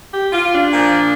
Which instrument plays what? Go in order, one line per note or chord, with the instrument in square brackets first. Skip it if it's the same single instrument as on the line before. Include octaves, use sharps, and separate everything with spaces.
[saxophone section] G4
F4
D4
A#2 F3